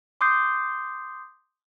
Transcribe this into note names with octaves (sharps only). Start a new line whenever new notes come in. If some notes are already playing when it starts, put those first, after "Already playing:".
C6 D6 D#6 G6 C7